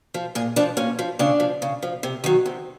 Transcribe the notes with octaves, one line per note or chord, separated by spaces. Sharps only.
F3
A#2 G#4
F3 D4
A#2 C#4
F3
C#3 D4
F3
C#3
F3
C3
D#3 F#3
C3